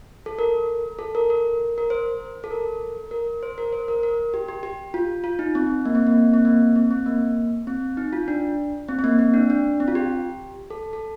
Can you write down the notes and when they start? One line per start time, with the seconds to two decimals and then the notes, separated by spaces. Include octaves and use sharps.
0.26 A4
0.39 A#4
0.99 A4
1.15 A#4
1.30 A#4
1.78 A#4
1.90 C5
2.44 A4
2.51 A#4
3.11 A#4
3.43 C5
3.58 A#4
3.73 C5
3.88 A#4
4.03 A#4
4.34 G4
4.48 G4
4.63 G4
4.94 F4
5.24 F4
5.39 D#4
5.55 C4
5.85 A#3
5.95 C4
6.07 A#3
6.34 C4
6.45 A#3
6.75 C4
6.91 C4
7.06 A#3
7.67 C4
7.97 D#4
8.13 F4
8.28 D4
8.88 C4
8.99 C4
9.04 A#3
9.19 C4
9.34 D4
9.50 D4
9.80 C4
9.88 F4
9.95 G4
10.70 A4
10.93 A4